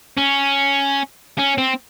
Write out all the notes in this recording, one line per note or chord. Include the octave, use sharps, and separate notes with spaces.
C#4
C#4
C4